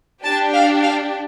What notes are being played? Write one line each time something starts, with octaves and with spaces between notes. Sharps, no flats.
D4 G4 A5
F5
F5